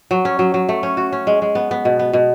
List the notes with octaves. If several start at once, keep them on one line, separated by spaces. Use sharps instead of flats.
F#3
C#4
F#3
F#3
A3
C#4
F#4
C#4
G#3
G#3
B3
B3
B2
B3
B2